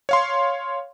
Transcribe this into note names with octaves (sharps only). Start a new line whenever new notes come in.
C#5 F5 C6